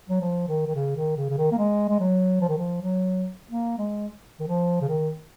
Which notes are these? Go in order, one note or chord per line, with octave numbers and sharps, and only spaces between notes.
F#3
F3
D#3
D#3
C#3
D#3
C#3
C#3
D#3
A#3
G#3
G#3
F#3
F3
D#3
F3
F#3
A#3
G#3
D#3
F3
C#3
D#3